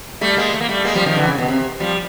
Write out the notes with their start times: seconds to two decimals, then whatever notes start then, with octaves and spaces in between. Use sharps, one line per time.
0.21 G3 A3
0.37 G#3 A#3
0.54 A3
0.61 A#3
0.69 G3 A3
0.85 G#3 A#3
0.95 F3 G3
1.06 D#3 F3
1.16 D3 E3
1.27 C#3
1.38 B2
1.48 C3
1.80 F3 G3